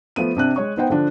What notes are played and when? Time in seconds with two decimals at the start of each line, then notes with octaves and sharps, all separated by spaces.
0.16 F3 A3 B3 D#7
0.37 C3 D4 F#6
0.56 G#3 C#5 C#6
0.77 B3 D#4 C5 F#5 G5
0.90 D3 F3 D4